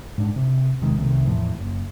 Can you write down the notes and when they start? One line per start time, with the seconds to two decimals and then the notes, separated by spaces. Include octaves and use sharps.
0.18 G#2 D4
0.36 C3
0.82 E1 C3 D#3 G#3
0.98 C2 C3 D#3 A3
1.25 E2 A2 F3
1.59 F#1